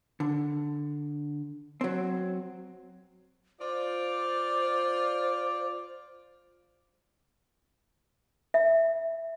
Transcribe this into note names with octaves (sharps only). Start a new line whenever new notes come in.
D3
F#3 C4
F4 C5 D5
E5